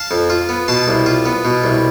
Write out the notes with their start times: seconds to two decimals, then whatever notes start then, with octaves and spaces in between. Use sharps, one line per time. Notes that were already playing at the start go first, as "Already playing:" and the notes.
Already playing: F5 A5
0.11 F2
0.30 F4
0.49 B3
0.68 B2 A5 C6
0.88 C2
1.06 F4
1.26 B3
1.45 B2
1.64 C2